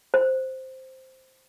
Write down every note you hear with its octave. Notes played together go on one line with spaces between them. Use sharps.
C5